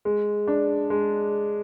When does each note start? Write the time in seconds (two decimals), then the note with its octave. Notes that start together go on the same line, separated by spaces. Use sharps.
0.05 G#3
0.48 D4
0.90 G#3